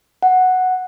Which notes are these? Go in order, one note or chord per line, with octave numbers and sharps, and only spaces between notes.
F#5